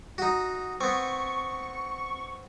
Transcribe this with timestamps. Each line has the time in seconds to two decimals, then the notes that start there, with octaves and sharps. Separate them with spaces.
0.18 D#4 F#4
0.81 B3 C4 C#6